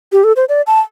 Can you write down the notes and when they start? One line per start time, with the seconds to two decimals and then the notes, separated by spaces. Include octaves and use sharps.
0.12 G4
0.24 A4
0.36 C5
0.49 D5
0.67 A5